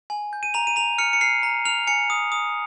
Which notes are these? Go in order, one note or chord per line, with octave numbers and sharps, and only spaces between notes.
G#5
G6
D#7
A#5 F7
D#7
A#5 F7
F6 C#7
C#7
F6 C7
A#5
F6 F7
G#5 C#7
D#6
D#6